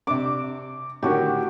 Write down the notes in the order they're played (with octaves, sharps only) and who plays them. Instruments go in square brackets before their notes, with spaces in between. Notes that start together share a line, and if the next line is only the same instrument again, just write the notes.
[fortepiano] C3 D4 [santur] D6
[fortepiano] A2 D3 D#3 [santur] F#4 G4